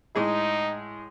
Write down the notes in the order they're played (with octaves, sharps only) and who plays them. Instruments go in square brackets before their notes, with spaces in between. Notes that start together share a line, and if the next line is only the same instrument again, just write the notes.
[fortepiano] A2 G#3 G#4 [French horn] D#4